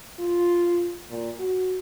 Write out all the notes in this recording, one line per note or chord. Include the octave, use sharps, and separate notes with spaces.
F4
A#2
F#4